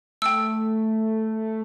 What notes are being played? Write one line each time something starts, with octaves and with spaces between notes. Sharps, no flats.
A3 G5 E6